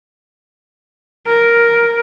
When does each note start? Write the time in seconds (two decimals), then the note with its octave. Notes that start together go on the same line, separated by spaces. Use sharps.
1.27 A#4